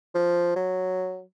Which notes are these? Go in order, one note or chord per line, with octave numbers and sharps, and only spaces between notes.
F3
F#3